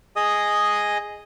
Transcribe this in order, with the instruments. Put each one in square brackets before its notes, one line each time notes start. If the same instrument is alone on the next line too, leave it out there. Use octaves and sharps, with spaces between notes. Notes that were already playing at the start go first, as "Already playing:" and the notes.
[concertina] G#4 D#5 D#6